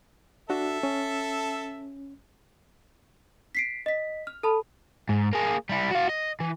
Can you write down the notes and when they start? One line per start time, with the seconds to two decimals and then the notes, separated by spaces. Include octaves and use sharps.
0.50 D4 F#4 A4 E5
0.83 C#4
3.55 B6 C7 D7
3.86 D#5 B6
4.27 F6
4.43 A4 A5 B5
5.09 G#2
5.33 A#3 G#4
5.69 G3 E4
5.91 F#4 F5
6.09 D#5
6.40 E3